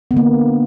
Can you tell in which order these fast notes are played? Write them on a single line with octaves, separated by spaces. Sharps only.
B3 D3 A#3